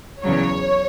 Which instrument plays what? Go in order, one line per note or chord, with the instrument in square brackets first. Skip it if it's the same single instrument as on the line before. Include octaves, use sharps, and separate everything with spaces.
[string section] E2 C#3 F#3 C#5